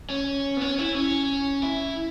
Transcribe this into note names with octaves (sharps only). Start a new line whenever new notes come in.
C#4
B3
C#4
E4
C#4
E4